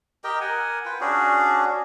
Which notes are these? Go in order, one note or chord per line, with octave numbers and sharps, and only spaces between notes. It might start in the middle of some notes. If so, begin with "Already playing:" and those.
G4 A#4 D#5 G5
A#4 F#5 G#5
F4 B4 G5
C#4 D4 F#4 G#4